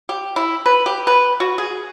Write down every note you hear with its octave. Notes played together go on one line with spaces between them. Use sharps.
G4
E4
B4
G4
B4
F#4
G#4